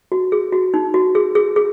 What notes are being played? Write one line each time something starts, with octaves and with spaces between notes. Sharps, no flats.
F#4
G#4
F#4
D#4
F#4
G#4
G#4
G#4